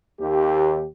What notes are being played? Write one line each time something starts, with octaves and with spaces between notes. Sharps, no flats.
D#2 G4